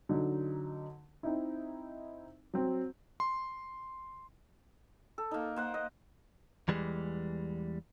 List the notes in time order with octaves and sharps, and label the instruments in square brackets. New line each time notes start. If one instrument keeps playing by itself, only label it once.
[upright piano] D3 F#3 D#4
C4 D#4 E4
F#3 C4
[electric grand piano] C6
[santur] A4
A#3 D#4
A#3 C5 F#5
D#5
[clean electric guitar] E2 E3 G3 G#3